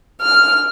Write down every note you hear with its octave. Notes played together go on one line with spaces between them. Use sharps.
F6